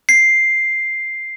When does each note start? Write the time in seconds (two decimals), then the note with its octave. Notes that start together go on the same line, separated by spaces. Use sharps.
0.09 C7